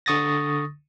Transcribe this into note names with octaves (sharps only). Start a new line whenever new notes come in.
D3 C#6 D#6 A6 A#6